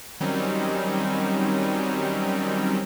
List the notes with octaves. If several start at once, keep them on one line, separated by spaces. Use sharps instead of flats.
D#3 F#3 G3 C4 C#4 D#4